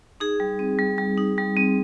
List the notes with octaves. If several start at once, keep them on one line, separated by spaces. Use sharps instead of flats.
D#4 G#4
G3
C4
G3
G3
D#4
G3
C4